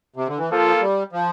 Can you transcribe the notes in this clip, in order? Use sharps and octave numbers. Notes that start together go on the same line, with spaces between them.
C3
D3
E3
F3 A#3 F4 A4
G3
F3